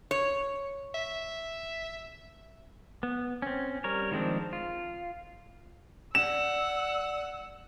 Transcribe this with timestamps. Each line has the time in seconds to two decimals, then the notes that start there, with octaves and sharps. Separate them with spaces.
0.11 C#5
0.95 E5
3.03 B3
3.42 C4 C#4
3.84 G3 A#4 C#5
4.11 D#3 F3 G#3 C4 D4
4.53 F4
6.15 D5 F#5 E6 E7